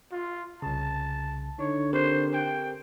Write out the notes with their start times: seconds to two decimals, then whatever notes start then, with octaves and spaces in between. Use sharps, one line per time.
0.12 F4
0.62 C2 C#3 A5
1.59 D3 D#4 C#5
1.93 C4 G4 A#4 C5
2.33 G5